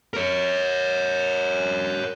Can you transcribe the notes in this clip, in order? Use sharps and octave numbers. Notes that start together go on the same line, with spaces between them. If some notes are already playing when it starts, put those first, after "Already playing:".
A#4 C#5